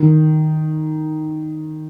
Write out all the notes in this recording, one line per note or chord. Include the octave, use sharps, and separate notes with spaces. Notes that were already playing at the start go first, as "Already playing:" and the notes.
Already playing: D#3